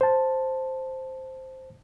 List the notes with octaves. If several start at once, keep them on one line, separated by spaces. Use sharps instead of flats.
C5 A5